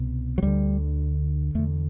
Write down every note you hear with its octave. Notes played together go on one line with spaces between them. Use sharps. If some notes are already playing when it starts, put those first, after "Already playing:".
Already playing: C2 B2
F#3
D2 D3 G3
E2 D3 A3